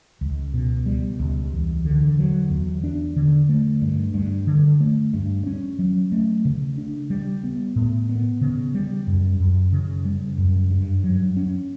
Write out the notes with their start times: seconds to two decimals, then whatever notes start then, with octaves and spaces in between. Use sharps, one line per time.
0.21 C#2
0.54 B2
0.86 G3
1.20 C#2
1.53 E2
1.85 D3
2.18 F#3
2.50 E2
2.84 D4
3.16 D3
3.49 A3
3.81 G2
4.14 G2
4.47 D3
4.80 A3
5.14 G2
5.46 C#4
5.79 F#3
6.12 A3
6.45 C#3
6.78 D4
7.10 G3
7.44 B3
7.76 A2
8.09 B3
8.41 C#3
8.74 G3
9.07 F#2
9.40 F#2
9.73 C#3
10.05 G3
10.38 F#2
10.71 G2
11.04 F#3
11.37 C#4